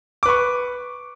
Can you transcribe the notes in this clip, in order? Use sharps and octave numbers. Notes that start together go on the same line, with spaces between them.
B4 C#6 D6